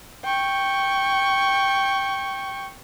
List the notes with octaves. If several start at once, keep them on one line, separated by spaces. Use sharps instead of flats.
G5 C#6